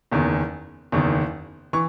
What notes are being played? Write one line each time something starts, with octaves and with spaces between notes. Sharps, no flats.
F#1 E2 D#3
F#1 E2 D#3
E3 C#6